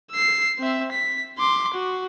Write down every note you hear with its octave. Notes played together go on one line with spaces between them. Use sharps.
E6 C7
C4 E5
B6
C6 D6
F#4